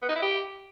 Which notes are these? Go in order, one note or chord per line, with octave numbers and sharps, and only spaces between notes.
B3
D#4
E4
G4